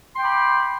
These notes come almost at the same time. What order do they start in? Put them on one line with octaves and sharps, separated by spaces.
C6 G5 B5 D6